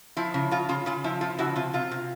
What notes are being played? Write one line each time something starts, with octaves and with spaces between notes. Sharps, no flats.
F3 E4
C#3
C#3 F4
C#3 F4
C#3 F4
F3 E4
F3 F4
C#3 E4 F#4
C3 F4
C3 F4
C3